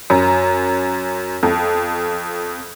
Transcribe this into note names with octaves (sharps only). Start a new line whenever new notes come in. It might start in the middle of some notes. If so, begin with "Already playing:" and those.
F#2
F2